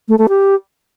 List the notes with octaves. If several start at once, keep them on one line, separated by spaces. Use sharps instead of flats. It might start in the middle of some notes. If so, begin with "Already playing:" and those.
A3
A3
G4